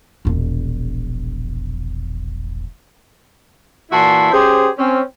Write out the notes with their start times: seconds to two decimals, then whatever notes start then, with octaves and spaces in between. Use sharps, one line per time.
0.25 E1 A#1
3.92 A#2 E3 E4 F#4 A5 C6
4.32 C#4 G4 G#4 C5
4.78 C4 C#4